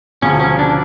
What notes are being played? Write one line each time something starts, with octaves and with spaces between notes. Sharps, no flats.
E1 D2 C#3 F3 C#4
C#4
D4